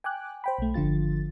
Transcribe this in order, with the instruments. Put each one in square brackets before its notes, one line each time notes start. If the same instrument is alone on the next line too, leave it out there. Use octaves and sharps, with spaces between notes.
[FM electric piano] G5 G#5 D6 F#6
C5 G5 B5
B1 A3
G1 D3 F3 F4 A6